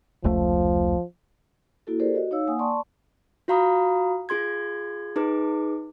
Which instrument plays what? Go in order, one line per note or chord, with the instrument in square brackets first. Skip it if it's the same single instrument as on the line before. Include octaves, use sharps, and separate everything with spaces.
[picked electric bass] F1 C#2 A3 [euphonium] F3
[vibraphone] A#3 E4 F#4 A4
G4 A4 A#4 C5 D5
F#4 D#5
D#4 C#5 F5 E6
A#3 F#5 G#5 D#6
D5 A5 C6 C#6
[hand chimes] F4 F#4 F5 A#5 B5 D#6
F4 G#4 C6 G#6
D#4 G#4 B4 D6